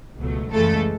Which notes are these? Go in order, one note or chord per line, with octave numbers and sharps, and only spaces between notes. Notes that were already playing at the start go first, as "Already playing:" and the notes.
C#2 B2 F#3 A3
F#2 C#3 E3 G#3 A3 A4